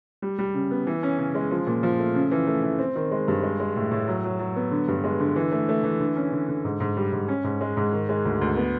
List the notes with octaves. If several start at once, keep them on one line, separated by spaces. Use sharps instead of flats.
G3
G3
C#3
B3
E3
C#4
C#3
G#3
F3
A#2
F3
A3
C#3
E3
A3
E3
C4
D#3
G#3
G2
G#3
G#3
A2
A2
F#3
F#3
F#3
B3
D3
G2
G#3
D3
E3
A3
A3
E3
D3
C#4
D3
D3
G#2
G#2
G3
G#2
C#4
G#2
G#3
G#2
D#3
G#3
D2
D2
B3